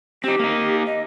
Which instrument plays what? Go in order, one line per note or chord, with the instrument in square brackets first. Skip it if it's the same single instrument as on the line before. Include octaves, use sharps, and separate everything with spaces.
[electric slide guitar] C4 D#4 [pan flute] G4
[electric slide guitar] A#3 D#4
[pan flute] D#5